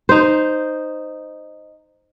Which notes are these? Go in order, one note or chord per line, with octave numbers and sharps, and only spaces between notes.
D#4 C5